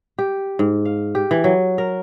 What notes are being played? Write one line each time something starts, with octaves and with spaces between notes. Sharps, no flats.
G4
G#2
F5
G4
E3
F#3
A#4